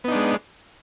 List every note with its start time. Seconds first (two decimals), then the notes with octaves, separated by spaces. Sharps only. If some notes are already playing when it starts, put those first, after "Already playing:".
0.04 B3
0.08 D#4
0.12 D4
0.15 G#3